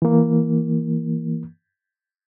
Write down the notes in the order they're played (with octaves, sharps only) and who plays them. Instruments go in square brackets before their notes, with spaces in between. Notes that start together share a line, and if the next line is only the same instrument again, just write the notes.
[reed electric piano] E3 A#3